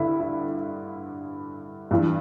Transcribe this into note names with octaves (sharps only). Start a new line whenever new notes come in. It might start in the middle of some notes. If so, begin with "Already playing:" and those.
Already playing: G2 D3 E4
E4
G2 E3